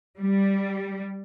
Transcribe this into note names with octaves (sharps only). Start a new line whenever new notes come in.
G3